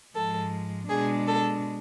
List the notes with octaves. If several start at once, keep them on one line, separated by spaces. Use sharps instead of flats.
G#2 F3 G#3 A4
B2 G#3 D4 G#4
A4